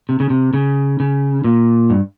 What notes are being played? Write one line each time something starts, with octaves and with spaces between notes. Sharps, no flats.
C3
C#3
C3
C#3
C#3
A#2
G2